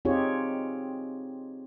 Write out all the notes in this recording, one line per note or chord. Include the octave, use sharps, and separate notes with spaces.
C4 D#4 F4 G4 G#4 C#5